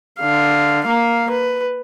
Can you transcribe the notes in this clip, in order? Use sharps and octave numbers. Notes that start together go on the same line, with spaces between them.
D3 F5
A#3 F5
B4